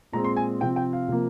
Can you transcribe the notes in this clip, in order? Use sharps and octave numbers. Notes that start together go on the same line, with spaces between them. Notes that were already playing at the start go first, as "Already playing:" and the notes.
A#2 G#3 C4 A#5
C6
G#5
C3 F3 C4 G5
G5
F5
C3 F3 A#3